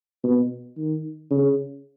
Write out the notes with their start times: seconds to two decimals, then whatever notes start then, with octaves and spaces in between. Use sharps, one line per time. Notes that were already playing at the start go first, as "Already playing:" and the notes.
0.23 B2
0.77 D#3
1.31 C#3